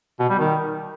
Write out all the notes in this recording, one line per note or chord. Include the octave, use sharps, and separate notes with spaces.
B2
G3
D#3